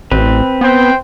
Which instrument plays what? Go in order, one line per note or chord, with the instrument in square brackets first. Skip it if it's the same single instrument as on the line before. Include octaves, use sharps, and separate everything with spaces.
[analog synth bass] A1 [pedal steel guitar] C4 B4
[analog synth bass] B3 [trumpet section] C5 G5